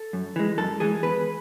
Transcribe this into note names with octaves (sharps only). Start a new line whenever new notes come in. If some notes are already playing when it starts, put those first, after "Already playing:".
Already playing: A4
F#2
E3 G#3
F#2 A4
E3 G#3 G#4
E2 B4